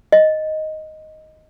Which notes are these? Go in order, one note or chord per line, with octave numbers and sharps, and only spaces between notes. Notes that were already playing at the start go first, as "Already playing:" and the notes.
D#5